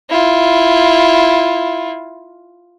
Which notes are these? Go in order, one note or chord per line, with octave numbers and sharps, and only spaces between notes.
E4 F4